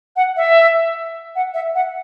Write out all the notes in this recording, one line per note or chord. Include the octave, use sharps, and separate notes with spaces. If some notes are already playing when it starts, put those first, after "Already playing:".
F#5
E5
F#5
E5
F#5